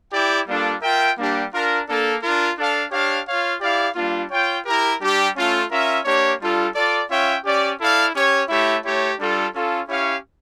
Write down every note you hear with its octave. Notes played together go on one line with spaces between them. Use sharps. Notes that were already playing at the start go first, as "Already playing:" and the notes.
E4 G4 D5 G5
G3 A#3 D4 F4 A4
F4 A#4 E5 G5
G3 A#3 D4 G4
D4 F4 A#4
A#3 D4 A4
D4 F4 A#4
D4 A4 D5 F5
D4 G4 C#5 F5
F4 C#5 F5
E4 G4 D5 F5
G3 A#3 D4 F4
F4 C#5 G5
E4 G4 A#4
G3 D4 G4
A3 C#4 F4 A4
C#4 F4 A#4 E5
A#3 D4 G4 C#5
G3 D4 F4 A4
F4 A4 D5
C#4 F4 C#5 E5 G5
C#4 G4 D5
E4 A4 D5 F5
C#4 G4 C#5
A3 E4 G4 C#5 E5
A3 E4 G4 C#5
G3 D4 F4 A4
C#4 F4 A4
C#4 E4 G4 C#5 F5